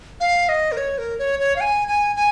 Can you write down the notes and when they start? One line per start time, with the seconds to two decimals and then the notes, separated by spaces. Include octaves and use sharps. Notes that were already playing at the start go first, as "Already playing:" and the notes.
0.20 F5
0.49 D#5
0.72 A#4
0.77 C#5
0.98 A#4
1.19 C#5
1.40 C#5
1.56 F5
1.61 G#5
1.88 G#5
2.16 G#5